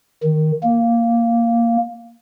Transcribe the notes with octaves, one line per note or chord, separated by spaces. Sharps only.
D#3
A#3